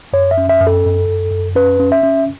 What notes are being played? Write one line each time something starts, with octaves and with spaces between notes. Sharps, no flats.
F#2 C#5
E5
C#4
E5
F#2
A4
F#2
F#2
F#2
C#4 B4
C#4
E5
C#4